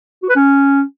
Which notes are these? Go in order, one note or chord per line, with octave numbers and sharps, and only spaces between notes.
F#4
B4
C#4